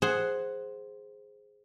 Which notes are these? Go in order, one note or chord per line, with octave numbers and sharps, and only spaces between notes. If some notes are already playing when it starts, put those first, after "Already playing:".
G#4 C5 F#5